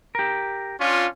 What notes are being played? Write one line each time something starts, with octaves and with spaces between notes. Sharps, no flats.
G4 A#4
C#4 D4 F4